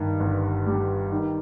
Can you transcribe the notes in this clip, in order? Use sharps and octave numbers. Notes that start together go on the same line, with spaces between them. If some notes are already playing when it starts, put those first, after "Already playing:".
Already playing: G2 D#3
G1
G3
D#3